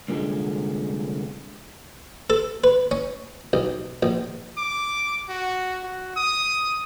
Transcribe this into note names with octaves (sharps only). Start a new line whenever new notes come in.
C2 A#2 D3 G#3
A4
B4
C#4
B1
A#1
D6
F#4
F#4
D#6